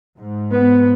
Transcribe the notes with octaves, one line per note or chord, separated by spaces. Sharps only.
G#2
B3